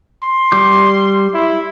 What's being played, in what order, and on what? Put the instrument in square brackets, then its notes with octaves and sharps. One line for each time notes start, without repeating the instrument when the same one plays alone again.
[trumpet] C6
[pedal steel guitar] G3 D6 G6
[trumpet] E4